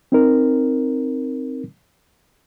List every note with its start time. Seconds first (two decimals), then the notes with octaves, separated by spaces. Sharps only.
0.12 C4 D#4 A#4